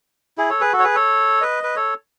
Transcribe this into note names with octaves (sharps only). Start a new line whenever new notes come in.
E4 G#4
A4 C#5
G#4 B4
F#4 A4
C#5
G#4 B4
A4 C#5
B4 D#5
B4
A4 C#5